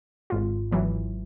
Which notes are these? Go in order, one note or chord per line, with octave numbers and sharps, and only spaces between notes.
G#1 G#2 F4
G#1 E3 F#3